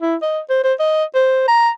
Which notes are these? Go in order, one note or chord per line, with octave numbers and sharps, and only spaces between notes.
E4
D#5
C5
C5
D#5
C5
A#5